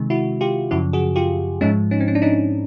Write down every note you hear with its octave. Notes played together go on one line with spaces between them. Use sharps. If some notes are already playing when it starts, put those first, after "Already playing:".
Already playing: C3 D#3 G#3
E4 F#4
F4 G4
F#2 C#3 F3 E4 F#4
F#4 G#4
F4 G4
G#2 F3 G#3 C#4 D#4
C#4 D#4
C4
C#4
D4
C#4 D#4